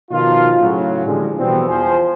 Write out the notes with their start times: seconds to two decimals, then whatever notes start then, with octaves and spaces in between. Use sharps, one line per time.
0.11 B2 D#3 F3 D#4 F4
0.60 A2 C#3 F#3
1.06 A2 D3 F3 G3 G#3
1.39 B2 E3 F3 G3 B3 C4
1.67 E2 F3 C5 G#5